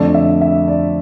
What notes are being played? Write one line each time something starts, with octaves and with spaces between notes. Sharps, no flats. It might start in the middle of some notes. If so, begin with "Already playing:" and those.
Already playing: F2 D3 A3 D5
E5
E5
D5